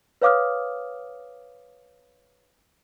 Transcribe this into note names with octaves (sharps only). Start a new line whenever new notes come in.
B4 C#5 F5 D6 D#6 F6